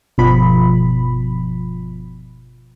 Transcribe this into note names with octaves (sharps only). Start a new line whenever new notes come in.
G1 B2 F3 B5